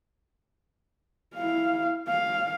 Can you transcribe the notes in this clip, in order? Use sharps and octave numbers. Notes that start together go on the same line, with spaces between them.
E4 F5
F5